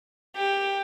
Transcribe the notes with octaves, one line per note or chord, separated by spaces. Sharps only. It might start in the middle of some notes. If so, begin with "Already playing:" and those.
G4